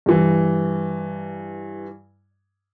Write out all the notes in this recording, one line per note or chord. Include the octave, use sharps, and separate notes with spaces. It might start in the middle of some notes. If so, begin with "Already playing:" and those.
G2 E3